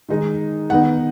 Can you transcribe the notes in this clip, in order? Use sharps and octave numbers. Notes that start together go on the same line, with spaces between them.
D#3 G#3 D#4
D#3 B3 D#4 F#5